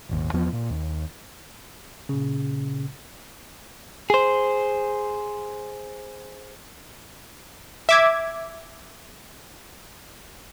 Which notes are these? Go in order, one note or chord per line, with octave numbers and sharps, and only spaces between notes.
D#1 G#1 D#2
E2 F3 B3
A#2
D#2
A#2 C#3
G#4 C5
E5 D6 G#6